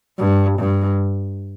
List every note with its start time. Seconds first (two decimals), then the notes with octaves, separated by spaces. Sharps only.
0.18 G2
0.58 G2